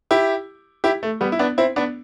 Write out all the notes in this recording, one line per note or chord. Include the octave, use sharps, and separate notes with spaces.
E4 G4
E4 G4
A3
G3 B3
E4
B3 D4
C4 E4
B3 D4